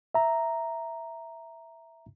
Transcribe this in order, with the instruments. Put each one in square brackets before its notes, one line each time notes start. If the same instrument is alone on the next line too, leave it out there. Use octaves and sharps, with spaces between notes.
[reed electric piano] E5 A#5